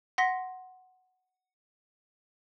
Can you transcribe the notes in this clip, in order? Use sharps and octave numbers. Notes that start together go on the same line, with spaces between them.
F#5 C6 A#6 B6